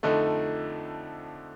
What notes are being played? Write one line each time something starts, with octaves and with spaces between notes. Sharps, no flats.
F2 D3 A3 D#4